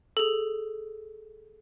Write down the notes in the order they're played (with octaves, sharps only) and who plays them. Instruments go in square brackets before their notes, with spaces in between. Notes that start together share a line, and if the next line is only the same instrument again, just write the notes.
[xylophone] G#4 A4